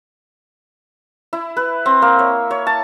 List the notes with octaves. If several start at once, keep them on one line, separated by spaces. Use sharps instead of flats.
E4
B4
C4
A#3
C#5
C#5
A5